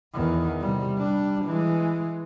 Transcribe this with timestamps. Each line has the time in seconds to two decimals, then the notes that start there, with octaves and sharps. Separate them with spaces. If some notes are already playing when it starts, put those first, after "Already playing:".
0.14 E2 D#3
0.61 C3 G3
0.99 G3 D4
1.45 E3 G#3